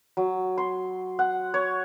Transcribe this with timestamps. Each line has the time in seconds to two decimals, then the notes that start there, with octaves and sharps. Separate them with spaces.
0.17 F#3
0.58 C6
1.19 F#5
1.54 C#5